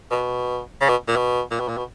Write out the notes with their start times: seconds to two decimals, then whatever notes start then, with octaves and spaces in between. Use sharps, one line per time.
0.11 B2
0.81 C#3
0.89 B2
1.08 A#2
1.16 B2
1.51 A#2
1.60 B2
1.69 A#2
1.77 B2